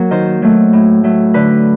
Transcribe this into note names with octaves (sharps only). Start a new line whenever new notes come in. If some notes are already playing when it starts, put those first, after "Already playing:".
Already playing: F#3 A#3 A#4
D#3 C5
F#3 A3
A2
F#3 A3
D3 B4